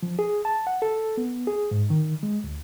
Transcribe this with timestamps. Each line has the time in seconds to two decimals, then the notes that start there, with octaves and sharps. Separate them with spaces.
0.03 F3
0.19 G#4
0.45 A5
0.67 F#5
0.82 A4
1.17 B3
1.47 G#4
1.71 G#2
1.90 D#3
2.23 G#3
2.44 D2